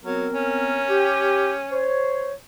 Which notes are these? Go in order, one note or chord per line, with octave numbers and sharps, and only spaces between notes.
F#3 B3 C4 A#4
C#4
G4
C5 C#5